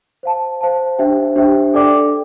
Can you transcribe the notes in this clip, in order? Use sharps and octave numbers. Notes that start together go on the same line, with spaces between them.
C5 F5 A5
C5 F5 A5
D4 G4 C5 E5 G5
D4 G4 C5 E5 G5
D4 A4 D5 G5 D6